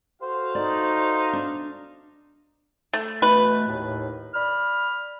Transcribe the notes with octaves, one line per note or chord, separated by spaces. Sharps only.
F#4 A4 C5 F5
D#4 D5
D4
A3
B2 E3 A3 B4
D#2 A2
D5 B5 F6